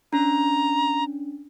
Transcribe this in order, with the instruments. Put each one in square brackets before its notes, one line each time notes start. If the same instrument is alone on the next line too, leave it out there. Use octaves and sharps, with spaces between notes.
[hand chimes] C#4 D4 [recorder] A#5